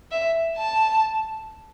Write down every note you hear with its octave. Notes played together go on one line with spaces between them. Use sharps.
E5
A5